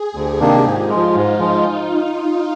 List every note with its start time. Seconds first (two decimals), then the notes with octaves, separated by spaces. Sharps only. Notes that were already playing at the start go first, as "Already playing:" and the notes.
Already playing: G#4
0.14 D2 G4
0.40 C3 D#3 A#3 D4
0.65 G#2 F4
0.90 F3 G#3
1.14 G#2 D#4
1.40 F3 G#3